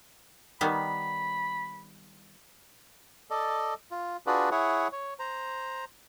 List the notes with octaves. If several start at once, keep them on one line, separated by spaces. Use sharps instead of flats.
D#3 G3 B3 B5
A4 D5 D#5
F4
D4 F4 F#4 G#4 B4 D5
E4 G#4 C#5 F#5
C#5
C5 A#5